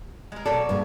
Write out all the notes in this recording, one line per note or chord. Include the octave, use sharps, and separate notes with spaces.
G#3 A#4
B2 F#3 A4 D5
G2 A#2 G#3